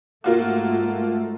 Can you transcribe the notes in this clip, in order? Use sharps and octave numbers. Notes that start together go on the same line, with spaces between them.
G#2 A3 A#3 F4 F#4